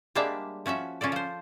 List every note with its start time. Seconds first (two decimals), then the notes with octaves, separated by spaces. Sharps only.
0.15 G3 G#3 A#3 D4 E5 F5
0.66 F3 C#4 F#4 E5
1.01 F3 C#4 F4 A4 D5
1.12 F3 C5